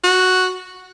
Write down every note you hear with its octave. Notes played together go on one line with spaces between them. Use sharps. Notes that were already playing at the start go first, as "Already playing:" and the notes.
F#4